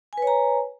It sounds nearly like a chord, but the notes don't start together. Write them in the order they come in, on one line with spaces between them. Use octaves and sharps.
G#5 B4 C#5 A#5